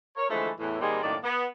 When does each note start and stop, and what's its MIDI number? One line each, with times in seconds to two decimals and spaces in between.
0.17 0.29 70
0.17 0.29 73
0.30 0.50 50
0.30 0.50 52
0.30 0.50 53
0.30 0.50 56
0.30 0.50 57
0.59 0.79 40
0.59 0.79 45
0.59 0.79 52
0.81 1.01 44
0.81 1.01 51
0.81 1.01 55
0.81 1.01 56
0.81 1.01 58
0.81 1.01 60
1.03 1.16 42
1.03 1.16 45
1.03 1.16 51
1.03 1.16 58
1.03 1.16 74
1.24 1.46 59